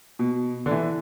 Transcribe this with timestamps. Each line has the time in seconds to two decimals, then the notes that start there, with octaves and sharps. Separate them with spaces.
0.19 B2
0.66 D3
0.71 E3